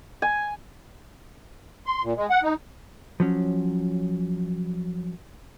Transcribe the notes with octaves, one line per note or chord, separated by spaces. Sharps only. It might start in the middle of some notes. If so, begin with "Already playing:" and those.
G#5
C6
A#2
G#3
F#5
D#4
F3 F#3 C#4